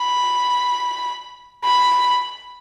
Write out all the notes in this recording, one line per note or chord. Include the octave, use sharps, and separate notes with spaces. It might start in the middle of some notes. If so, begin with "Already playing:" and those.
Already playing: B5
B5